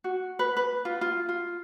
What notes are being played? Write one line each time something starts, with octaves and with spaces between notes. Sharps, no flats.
F#4
B4
B4
F4
F4
F4